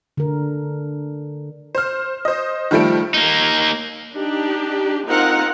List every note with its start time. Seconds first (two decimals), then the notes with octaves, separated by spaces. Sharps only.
0.17 D3 A#4
1.75 C5 F6
2.25 C5 D#5
2.71 D#3 F3 G3 A3 D7
3.14 A#3 D#4
4.14 D4 D#4 G4
5.05 C4 D#4 F4 A#4 F#5